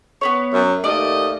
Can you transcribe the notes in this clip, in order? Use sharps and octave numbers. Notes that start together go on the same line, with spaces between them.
B3 B4 C#5
F#2
D#2 A3 D5 D#5